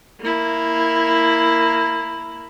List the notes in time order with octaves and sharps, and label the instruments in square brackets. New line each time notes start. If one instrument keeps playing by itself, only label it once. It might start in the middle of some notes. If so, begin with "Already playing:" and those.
[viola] A#3 E4